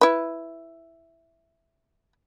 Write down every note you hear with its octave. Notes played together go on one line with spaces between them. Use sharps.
E4 B4